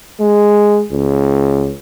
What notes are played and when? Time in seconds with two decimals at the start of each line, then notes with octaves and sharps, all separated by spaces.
0.20 G#3
0.91 C#2